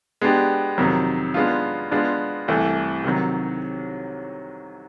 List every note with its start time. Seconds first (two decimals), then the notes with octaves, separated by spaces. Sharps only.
0.21 G#3 B3 D4 G4
0.78 F2 C3 D#3 F#3
1.34 G#3 B3 D4 F4
1.91 G#3 B3 D4 F4
2.48 C2 C3 E3 A3
3.04 C3 D#3 F#3